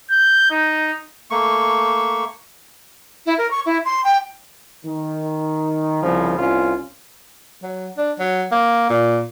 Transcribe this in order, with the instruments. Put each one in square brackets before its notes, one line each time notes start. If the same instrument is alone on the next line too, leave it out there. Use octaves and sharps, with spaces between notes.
[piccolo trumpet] G6
D#4
[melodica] A3 A#3 C#6
[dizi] E4
A#4
C#6
E4
C6
G5
[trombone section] D#3
C2 C#3 F3
C2 C#4 F4
[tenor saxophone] F#3
D4
F#3
A#3
A#2